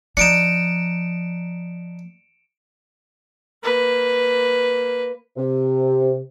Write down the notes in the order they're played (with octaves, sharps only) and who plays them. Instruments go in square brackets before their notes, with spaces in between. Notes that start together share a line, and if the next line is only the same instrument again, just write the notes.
[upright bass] F3 [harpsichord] D4 D#4 [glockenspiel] C#7 D7 E7
[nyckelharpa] A#3 B4
[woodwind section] C3